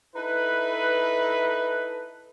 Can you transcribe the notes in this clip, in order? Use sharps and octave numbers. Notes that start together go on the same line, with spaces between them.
D#4 E4 A4 B4